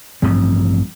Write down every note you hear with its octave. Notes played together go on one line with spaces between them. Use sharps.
A1 G2 F3 C4